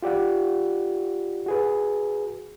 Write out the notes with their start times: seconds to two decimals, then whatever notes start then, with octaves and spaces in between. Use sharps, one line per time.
0.02 F4 G4 D5 F#5
1.46 F#4 G#4 B4